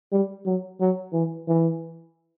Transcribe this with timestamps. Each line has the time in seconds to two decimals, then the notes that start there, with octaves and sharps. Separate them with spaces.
0.12 G3
0.45 F#3
0.80 F#3
1.13 E3
1.48 E3